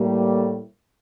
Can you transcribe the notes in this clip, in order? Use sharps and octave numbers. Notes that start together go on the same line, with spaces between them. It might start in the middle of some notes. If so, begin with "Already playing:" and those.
Already playing: A2 G3 A#3